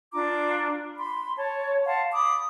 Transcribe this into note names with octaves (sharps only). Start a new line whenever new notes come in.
D4 F4 A#5 D6
B5 C6
C#5 A5
F5 F#5 A5 C6
B5 D6 D#6